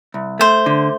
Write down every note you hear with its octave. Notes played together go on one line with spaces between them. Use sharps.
C2
A3 C5
D3